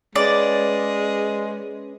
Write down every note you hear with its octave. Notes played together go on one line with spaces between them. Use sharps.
G#3 C#4 B4 D5